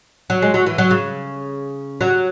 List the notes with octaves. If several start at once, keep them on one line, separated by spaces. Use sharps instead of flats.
F#3
G#3
F#3
E3
F#3
C#3
F#3